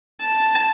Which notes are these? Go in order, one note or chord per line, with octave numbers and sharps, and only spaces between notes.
A5